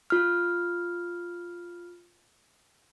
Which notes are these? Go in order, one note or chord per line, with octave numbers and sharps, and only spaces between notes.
F4 F6